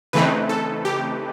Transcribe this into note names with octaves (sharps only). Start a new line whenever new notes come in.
C#3 E3 A3 C4 D#4 B4
A4
G4